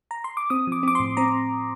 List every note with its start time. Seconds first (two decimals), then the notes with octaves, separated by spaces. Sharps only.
0.11 A#5
0.24 C6
0.37 D6
0.50 C4 D#6
0.67 F3 D6
0.83 C4 D6
0.95 A2 C6
1.17 C4 A#5